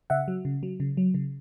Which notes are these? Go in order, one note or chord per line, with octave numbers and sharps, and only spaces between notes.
C#3 E5 F#5
F#3
C#3
F#3
C#3
F#3
C#3